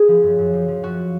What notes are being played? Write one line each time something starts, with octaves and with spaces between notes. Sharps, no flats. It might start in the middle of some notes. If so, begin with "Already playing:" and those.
Already playing: G#4
F3
F#2
F#2
F3
F3
F#2 F#4